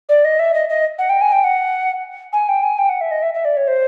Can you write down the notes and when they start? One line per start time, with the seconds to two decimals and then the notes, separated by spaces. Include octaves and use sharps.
0.09 D5
0.25 D#5
0.39 E5
0.54 D#5
0.69 D#5
0.99 F#5
1.09 G5
1.21 G#5
1.32 G5
1.44 F#5
2.33 G#5
2.49 G5
2.63 G#5
2.78 G5
2.89 F#5
3.01 E5
3.11 D#5
3.22 E5
3.34 E5
3.45 D5
3.57 C#5
3.68 C5